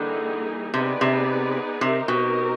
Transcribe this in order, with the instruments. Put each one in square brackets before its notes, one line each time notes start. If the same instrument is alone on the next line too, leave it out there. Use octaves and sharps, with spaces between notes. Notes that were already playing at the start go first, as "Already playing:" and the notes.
Already playing: [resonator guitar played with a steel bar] D3 [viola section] E3 G3 A#3 D#4 G#4
[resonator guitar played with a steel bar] C3 [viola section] B3 D#4 G#4 B4 D5
[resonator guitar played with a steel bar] C3
[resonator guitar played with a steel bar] C3 [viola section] C4 D#4 G4 A#4
[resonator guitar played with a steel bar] B2